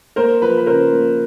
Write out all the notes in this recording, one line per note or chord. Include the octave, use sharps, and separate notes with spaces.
A#3 A#4 C5
F3 B4
B4
C#3 A#4 C5
A#3